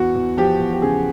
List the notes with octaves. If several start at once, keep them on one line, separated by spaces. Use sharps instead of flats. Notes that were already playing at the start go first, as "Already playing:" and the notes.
Already playing: E2 F#4
E2
F3 G4
E2
G4
C#3 G#4